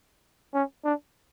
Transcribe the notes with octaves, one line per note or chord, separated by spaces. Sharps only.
C#4
D4